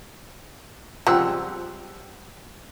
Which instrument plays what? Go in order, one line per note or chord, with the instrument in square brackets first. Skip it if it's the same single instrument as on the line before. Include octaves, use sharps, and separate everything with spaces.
[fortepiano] F3 F#5 E6 [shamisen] G3 G#3 C4